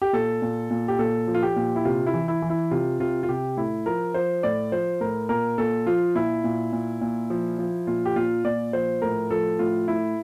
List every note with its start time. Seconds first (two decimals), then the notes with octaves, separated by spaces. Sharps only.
0.02 G4
0.13 A#2 A4
0.42 A#2
0.71 A#2
0.88 G4
0.99 A#2 A4
1.28 F3
1.34 F4
1.43 G4
1.56 A#2
1.76 E4
1.85 C3 F4
2.07 E4
2.14 E3
2.28 E4
2.42 E3
2.50 E4
2.71 C3 F4
3.00 C3 F4
3.23 F4
3.29 C3 G4
3.57 A2 E4
3.86 F3 A#4
4.14 F3 C5
4.43 A2 D5
4.72 F3 C5
5.01 A2 A#4
5.29 A#2 A#4
5.58 A#2 A4
5.86 F3 F4
6.15 A#2 E4
6.44 A#2
6.73 A#2
7.01 A#2
7.30 F3
7.59 F3
7.87 A#2 F4
8.06 G4
8.16 A#2 F4
8.45 A#2 D5
8.73 F3 C5
9.02 A2 A#4
9.31 F3 A4
9.59 A2 F4
9.88 A2 E4